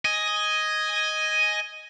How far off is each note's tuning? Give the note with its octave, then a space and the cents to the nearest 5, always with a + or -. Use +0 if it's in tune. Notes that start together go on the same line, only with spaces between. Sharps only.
D#5 +5 G#5 +0